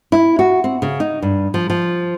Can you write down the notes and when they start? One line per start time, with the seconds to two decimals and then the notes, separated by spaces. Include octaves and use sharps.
0.12 E4
0.39 F#4
0.64 C4
0.82 C#3
1.00 D#4
1.22 G2
1.54 F3
1.70 F3